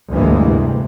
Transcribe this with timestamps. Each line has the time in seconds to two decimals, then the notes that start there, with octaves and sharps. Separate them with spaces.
0.11 G1 D2 A2 E3 G#3 A#3
0.43 C3